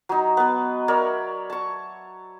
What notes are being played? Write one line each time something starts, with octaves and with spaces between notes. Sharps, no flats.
F#3 D#4
B3 B4
A#4 C#5 D5 E5
A5 C#6